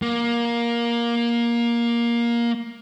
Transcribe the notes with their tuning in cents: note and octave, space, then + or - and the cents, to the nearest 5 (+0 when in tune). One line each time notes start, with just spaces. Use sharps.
A#3 +15